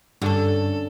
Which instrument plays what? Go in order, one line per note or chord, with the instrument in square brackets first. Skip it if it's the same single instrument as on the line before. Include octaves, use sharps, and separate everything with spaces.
[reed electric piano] G2 [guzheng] D3 C#4 [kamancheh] A4